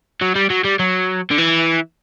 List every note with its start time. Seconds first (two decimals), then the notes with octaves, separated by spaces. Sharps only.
0.22 F#3
0.36 G3
0.50 F#3
0.64 G3
0.79 F#3
1.31 D3
1.38 E3